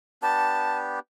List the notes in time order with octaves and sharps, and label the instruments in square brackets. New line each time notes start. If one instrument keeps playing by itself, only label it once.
[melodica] B3 D4 G4 [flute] A5